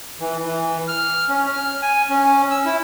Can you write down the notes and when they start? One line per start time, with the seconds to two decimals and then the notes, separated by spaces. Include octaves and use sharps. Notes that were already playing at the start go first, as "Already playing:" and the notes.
0.20 E3
0.45 E3
0.88 F6
1.29 C#4
1.54 F6
1.82 G#5
2.10 C#4
2.51 E6
2.65 E4